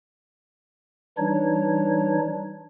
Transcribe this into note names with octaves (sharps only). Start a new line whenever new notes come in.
E3 G3 D4 D#4 C#5